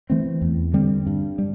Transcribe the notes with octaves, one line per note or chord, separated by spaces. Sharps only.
E3 A3 C4
E2
D3 G3 C4
G2
G3